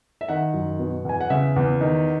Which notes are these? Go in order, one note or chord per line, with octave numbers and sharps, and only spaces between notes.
E5
D#3 F#5
F#2
B2
E2 G#5
F#5
C#3 E5
E2
D#3